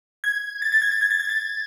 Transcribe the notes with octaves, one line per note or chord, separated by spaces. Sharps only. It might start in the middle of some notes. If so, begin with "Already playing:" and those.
G#6
A6
A6
G#6
A6
G#6
A6
G#6
A6